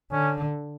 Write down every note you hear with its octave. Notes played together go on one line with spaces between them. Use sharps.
D3 C#4